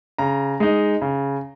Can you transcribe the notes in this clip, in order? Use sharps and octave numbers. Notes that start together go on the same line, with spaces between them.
C#3 A#5
G#3 D#4
C#3